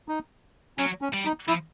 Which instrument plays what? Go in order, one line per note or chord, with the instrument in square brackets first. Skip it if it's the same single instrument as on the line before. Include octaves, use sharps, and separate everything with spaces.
[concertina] D#4
[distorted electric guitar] F#3 [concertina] C#4
[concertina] C#4
[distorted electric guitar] G3
[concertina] D#4
[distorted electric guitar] F3 [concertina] E4